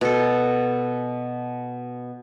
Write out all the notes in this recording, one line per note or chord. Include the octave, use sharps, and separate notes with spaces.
B2 A4